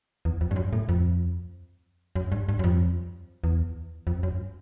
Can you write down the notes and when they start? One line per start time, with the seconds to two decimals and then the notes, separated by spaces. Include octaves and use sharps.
0.25 E2
0.41 F2
0.51 G2
0.56 F#2
0.73 A2
0.89 F2
2.16 F#2
2.32 G2
2.49 G2
2.59 F#2
2.64 F2
3.44 E2
4.07 F2
4.23 F#2